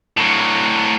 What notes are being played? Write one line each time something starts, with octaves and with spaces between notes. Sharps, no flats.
A2 F#3